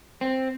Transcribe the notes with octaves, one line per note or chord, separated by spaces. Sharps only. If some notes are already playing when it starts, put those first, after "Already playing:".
C4